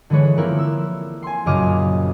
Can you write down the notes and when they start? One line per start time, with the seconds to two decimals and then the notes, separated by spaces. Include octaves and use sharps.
0.10 D3 E3 G#3 B4 C#5
0.37 F3 A#3 C4 E4 A#4 B4
0.59 E6
1.23 G#5 C6
1.46 A#1 F#2 C#3 D#5 D6 F6